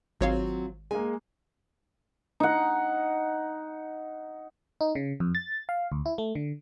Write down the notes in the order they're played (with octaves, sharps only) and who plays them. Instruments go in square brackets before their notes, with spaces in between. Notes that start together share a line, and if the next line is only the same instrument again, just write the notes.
[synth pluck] G#1 C#5 F5 [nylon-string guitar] F#3 C4 F4
[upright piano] G#3 A#3 [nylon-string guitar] G#5
[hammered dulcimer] D#4 F#5
[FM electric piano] D#4
C#3
F2
A6
F5
D2
E4
A3
D3